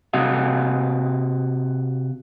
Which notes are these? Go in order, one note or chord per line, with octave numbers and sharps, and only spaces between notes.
C3 F#4 D#5 F5